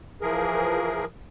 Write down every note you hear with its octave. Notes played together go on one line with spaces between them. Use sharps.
E3 F3 G#4 A#4